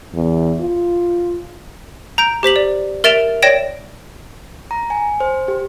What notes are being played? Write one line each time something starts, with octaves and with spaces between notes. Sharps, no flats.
E2
F4
A#5 G6 D7
G4 C5 B6 F#7
D5
A#4 E5 A6 D7 E7 F7
C#5 D5 G5 A#6 D7 E7
A#5
G#5
C5
G4